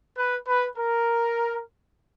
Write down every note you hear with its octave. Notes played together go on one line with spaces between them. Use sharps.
B4
B4
A#4